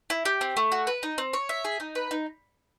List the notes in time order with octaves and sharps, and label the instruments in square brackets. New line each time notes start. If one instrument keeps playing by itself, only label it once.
[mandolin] E4
G4
C4
A3
F#4
B4
D#4
C4
C#5
E5
G#4
D#4
B4
D#4